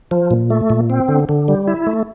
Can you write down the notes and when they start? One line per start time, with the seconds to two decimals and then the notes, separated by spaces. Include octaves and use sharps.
0.11 F3
0.31 A#2
0.50 A3
0.70 A#2
0.90 C4
1.08 D3
1.29 D3
1.48 G3
1.67 E4
1.87 A3